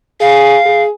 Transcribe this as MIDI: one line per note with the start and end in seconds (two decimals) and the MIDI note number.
0.21 0.59 68
0.21 0.83 77
0.66 0.90 68